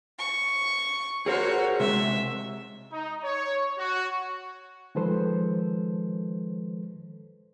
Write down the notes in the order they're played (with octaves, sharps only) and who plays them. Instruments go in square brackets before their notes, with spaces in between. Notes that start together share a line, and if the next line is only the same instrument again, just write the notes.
[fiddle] C#6
[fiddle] F#4 C#5 [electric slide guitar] G#4 A#4 C5
[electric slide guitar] C3 G#3 [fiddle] E5
[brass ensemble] D#4
C#5
F#4
[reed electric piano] D#3 F3 G#3 A4 B4 C5